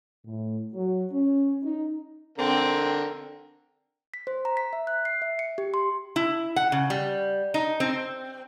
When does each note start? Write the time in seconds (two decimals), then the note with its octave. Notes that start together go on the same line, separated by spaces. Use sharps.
0.25 A2
0.74 F#3
1.12 C#4
1.63 D#4
2.38 D3 C4 A#4
4.14 B6
4.27 C5
4.45 A#5
4.57 B6
4.73 E5
4.87 F#6
5.05 C7
5.22 E5
5.39 C#7
5.58 G4
5.74 C6
6.16 E4
6.56 F#5
6.72 C#3
6.90 G3
7.54 D#4
7.80 C4